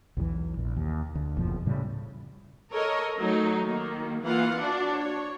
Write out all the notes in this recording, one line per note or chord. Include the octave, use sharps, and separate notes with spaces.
B1 E2 D#3 E3
A#1
D#2
D2
F#1 F2 B2 F3
A2 C#3 G3
A4 A#4 C#5 D#5
F#3 A3 D#4
D#3 A#3
E3 A#3 F4 F5 F#5
D4 F#4 D5
C#5